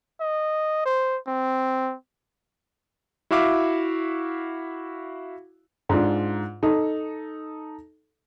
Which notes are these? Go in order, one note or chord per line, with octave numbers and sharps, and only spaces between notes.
D#5
C5
C4
E4 F#4 E5 F5 D6
G#2 D4 F4
D#4 A4